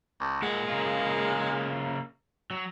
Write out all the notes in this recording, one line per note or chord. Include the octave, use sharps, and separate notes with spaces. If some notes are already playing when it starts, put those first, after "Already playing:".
C#2
A#2 G#3 F#5
C#3 A#3 F4
F#3